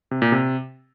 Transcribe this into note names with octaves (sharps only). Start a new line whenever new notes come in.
C3
A#2
C3